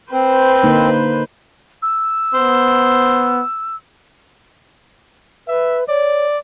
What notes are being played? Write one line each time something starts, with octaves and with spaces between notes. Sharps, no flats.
C4 B4 C5
D3 A#3 D#4
E6
B3 C5
B4 E5
C#5 D5